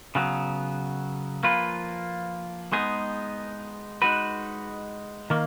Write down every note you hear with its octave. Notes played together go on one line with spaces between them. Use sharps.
C#3 F#3 B3
F3 A#3 F4 B4
G#3 B3 D#4 G#4
G#3 D#4 F#4 B4
D#3 A#3